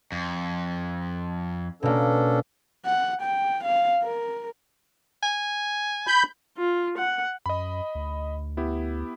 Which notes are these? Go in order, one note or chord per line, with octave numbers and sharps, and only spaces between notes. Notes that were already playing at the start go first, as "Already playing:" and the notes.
F2
B2 A#3 C#4 D4 A4
F#5
G5
F5
A#4
G#5
B5 G6
F4
F#5
F#2 D#5 B5
D2
B3 E4 G4